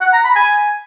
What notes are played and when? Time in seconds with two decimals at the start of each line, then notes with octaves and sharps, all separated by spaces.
0.01 F#5
0.13 A#5
0.25 B5
0.36 G#5